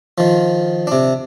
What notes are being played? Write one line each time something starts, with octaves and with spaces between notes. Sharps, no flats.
D#3 F3
C3 D4